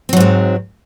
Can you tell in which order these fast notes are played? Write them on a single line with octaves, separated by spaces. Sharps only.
C4 F#3 G#2 G#3